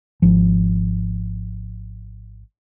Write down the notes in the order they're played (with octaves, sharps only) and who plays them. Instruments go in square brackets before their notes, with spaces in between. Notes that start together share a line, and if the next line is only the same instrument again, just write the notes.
[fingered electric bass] G#1 F3